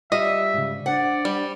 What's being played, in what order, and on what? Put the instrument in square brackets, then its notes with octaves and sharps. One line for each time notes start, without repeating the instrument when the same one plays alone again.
[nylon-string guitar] G3 [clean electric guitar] F4 [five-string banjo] D#5 [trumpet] E5
[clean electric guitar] G#2 C#3
[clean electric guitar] D4 C5 [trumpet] D5 [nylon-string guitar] F#5
[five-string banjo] G3